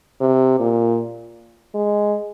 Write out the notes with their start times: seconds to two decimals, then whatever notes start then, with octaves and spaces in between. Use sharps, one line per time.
0.20 C3
0.60 A#2
1.74 G#3